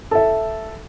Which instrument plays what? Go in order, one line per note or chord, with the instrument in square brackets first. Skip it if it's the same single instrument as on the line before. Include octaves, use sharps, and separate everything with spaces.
[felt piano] A4 E5